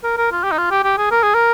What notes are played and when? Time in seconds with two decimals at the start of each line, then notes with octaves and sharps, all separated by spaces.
0.04 A#4
0.18 A#4
0.32 F4
0.44 G4
0.52 D#4
0.58 F4
0.71 G4
0.84 G4
0.98 G#4
1.11 A#4
1.23 G#4
1.34 A#4